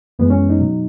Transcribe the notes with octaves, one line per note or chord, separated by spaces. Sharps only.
F#2 E3 G#3 B3
C#4
D#4
B2 F#3